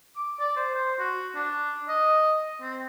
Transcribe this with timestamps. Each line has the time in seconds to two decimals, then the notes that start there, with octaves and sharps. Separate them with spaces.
0.16 D6
0.39 D5
0.56 C5
0.75 C5
0.99 F#4
1.35 D4
1.88 D#5
2.61 C4